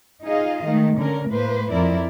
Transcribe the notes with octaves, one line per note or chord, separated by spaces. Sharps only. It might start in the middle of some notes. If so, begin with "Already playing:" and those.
D#4 F4 G#4 D#5 F5
D#3 G#3 A3
D3 C#4 A#4
A2 A#3 B4 C5
F2 C4 E4 A#4 D5